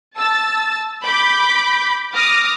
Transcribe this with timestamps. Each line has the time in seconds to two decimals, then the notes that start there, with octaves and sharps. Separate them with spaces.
0.18 A5 E6 A6
1.04 B5 D6 G6 B6
2.14 D6 D#6 F6 A#6